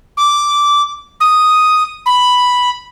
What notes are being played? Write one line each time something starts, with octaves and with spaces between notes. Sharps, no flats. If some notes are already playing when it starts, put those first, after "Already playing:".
D6
D#6
B5